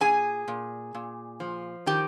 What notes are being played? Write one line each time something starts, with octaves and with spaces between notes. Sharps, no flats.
A#2 G#4 G#5
A#2
A#2
F3
D#3 G4 G5